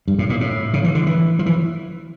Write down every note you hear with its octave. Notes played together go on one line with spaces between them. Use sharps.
G2
A2
A#2
A2
C#3
E3
D3
E3
F3
E3